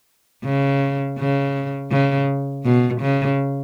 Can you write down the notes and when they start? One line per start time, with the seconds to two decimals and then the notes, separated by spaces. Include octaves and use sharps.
0.44 C#3
1.18 C#3
1.91 C#3
2.65 B2
3.01 C#3